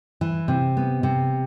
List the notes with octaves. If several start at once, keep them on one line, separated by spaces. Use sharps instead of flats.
E3
C3
B3
C3